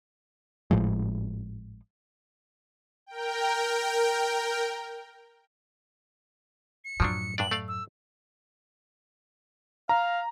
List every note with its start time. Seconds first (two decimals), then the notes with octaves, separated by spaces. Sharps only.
0.71 G#1 A2 F3 G#3
3.06 A#4 G5
6.85 C#7
7.00 F#2 A2 F3 F#3 D4
7.38 G2 D4 D5 F#7
7.51 A3 D5 F5
7.68 E6
9.89 F5 A#5